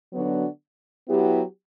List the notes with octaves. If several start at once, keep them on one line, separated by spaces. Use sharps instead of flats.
D3 F#3 B3 D4 F#4
F#3 B3 E4 G4